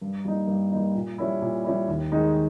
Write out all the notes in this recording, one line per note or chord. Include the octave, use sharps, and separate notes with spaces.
G2
G3 A#3 D#4
G2
G3 A#3 D#4
A#2
G3 C#4 E4
A#2
G3 C#4 E4
D#2
D#3 G#3 D#4